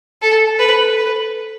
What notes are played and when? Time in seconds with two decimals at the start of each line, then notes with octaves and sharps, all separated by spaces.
0.22 A4
0.60 B4
0.96 B4